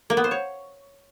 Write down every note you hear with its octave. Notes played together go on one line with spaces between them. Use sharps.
A#3
B3
C5
C#5